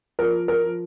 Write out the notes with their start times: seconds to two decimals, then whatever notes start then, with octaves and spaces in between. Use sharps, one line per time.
0.19 F3 A#4
0.48 A#4
0.63 F3